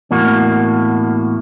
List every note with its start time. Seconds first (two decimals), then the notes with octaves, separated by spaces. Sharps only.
0.11 E2 A2 A#3 F#4